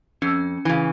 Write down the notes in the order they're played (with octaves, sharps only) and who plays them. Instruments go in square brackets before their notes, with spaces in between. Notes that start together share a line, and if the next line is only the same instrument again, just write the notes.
[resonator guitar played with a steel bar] F2 [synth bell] C#4
[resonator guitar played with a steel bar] C#3 E3